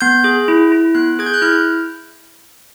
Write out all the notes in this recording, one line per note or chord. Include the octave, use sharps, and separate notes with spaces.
B3 G6
G#4
E4
E4
B3 F#6
G#4 G#6
G6
F#6
E4 F6